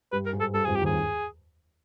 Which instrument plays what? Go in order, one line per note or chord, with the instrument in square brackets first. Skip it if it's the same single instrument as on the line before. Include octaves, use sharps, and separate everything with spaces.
[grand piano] G2 G3 [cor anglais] B4
[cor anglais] A#4
[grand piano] G#2 G#3
[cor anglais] A4
[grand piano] G2 G3 [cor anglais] A4
[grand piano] F2 F3 [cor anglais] G#4
[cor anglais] G4
[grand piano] D#2 D#3 [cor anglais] G#4